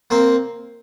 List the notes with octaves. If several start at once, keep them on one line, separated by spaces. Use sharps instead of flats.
A#3 C4